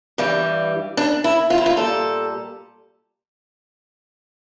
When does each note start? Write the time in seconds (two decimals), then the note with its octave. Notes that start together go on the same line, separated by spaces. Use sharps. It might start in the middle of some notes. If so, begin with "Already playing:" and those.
0.18 G2 E3 G3
0.97 D4
1.24 E4
1.50 F4
1.58 E4
1.66 F4
1.77 A#2 G3 A4